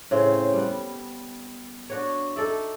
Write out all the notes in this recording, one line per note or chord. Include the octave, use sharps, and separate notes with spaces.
A2 C#3 C4 C5
G3 B3
D4 F#4 C#5
D#4 A4 D5 E5